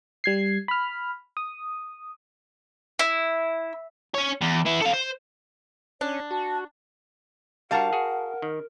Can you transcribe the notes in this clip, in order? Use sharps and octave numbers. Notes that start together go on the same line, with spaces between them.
G3 G#6 C7
B5 F6
D#6
E4
C#4 C#5
E2
B3 E4
A4 F5
C5
C#4 D4 C#5
F#4 A5
G3 D4 F#4 A#4 F5 F#5 A5 A#5
F#4 G#4
D#3